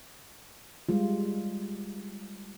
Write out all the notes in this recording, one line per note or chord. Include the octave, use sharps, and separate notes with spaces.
G3 G#3 F4